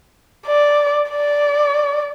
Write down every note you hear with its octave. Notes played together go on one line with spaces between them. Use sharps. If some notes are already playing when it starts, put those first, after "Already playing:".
D5
D5